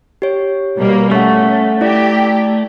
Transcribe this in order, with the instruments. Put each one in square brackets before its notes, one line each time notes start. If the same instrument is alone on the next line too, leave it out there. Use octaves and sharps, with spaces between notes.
[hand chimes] G4 C#5
[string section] B2 G3 A#3
[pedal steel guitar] A3 [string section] C#4 [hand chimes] F#5 C#6
[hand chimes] E4 D5 [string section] G4